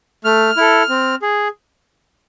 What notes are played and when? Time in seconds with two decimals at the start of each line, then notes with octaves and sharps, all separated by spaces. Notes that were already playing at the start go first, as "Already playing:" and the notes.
0.24 A3 F6
0.57 E4 A4
0.89 C4
1.22 G#4